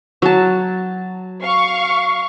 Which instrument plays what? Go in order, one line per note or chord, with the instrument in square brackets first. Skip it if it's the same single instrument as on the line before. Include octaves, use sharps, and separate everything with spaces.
[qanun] F#3 A5
[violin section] F5 C#6